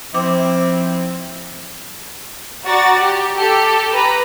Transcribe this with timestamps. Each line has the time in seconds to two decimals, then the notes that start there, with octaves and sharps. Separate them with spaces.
0.14 F3 C4 E4 D6
2.65 F#4 D5 A#5 C#6 A6
3.00 G4
3.37 G4 A4
3.92 B4 A#5 B5